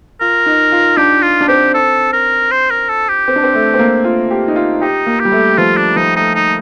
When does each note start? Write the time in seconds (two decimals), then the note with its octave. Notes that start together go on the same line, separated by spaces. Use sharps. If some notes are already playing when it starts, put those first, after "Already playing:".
0.21 F4 A#4
0.46 D#4
0.72 F4
0.97 D4 G4
1.23 F4
1.41 D4
1.48 C4 G4
1.74 A4
2.13 A#4
2.51 C5
2.70 A#4
2.89 A4
3.09 G4
3.28 C4
3.36 D4
3.43 C4
3.54 A3
3.74 C4
3.79 A#3
4.04 F4
4.31 G4
4.48 D#4
4.56 F4
4.81 D#4 G4
5.06 A#3
5.20 G3 G4
5.32 A3
5.58 F3 F4
5.77 D4
5.96 F3 D#4
6.16 A3 D#4
6.35 D#4